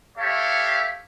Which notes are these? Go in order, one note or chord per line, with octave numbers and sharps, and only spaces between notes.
G4 A4 C#5 E5 F5